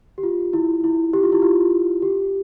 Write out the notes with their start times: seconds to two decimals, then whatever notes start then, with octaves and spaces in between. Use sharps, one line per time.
0.18 G4
0.23 F4
0.53 E4
0.84 E4
1.13 G4
1.23 F4
1.32 E4
1.42 F4
2.02 G4